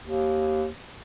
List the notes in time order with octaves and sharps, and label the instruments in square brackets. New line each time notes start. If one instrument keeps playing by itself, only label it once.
[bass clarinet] D#2